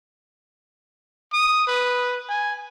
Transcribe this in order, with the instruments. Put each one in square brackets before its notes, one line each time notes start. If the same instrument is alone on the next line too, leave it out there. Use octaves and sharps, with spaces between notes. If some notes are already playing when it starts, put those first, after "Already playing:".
[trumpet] D#6
B4
G#5